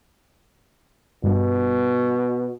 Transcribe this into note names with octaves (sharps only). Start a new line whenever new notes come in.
G2 B2